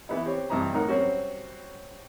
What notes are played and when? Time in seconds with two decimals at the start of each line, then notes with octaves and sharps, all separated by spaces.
0.09 E3 B3 E4
0.25 C4 G4 C#5
0.50 G2 C3 E3 D#5 A#5 B5
0.73 A2 D#4 A#4 F#5
0.89 F#3 G3 C4 C#4 F#4